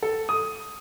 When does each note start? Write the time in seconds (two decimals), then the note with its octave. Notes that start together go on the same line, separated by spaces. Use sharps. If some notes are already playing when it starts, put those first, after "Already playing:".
0.03 A4
0.29 D#6